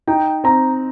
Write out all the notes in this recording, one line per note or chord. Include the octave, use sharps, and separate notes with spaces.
D#4 G5
C4 A#5